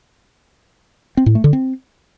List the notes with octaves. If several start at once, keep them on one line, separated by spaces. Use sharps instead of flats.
C4
A2
A3
D3
C4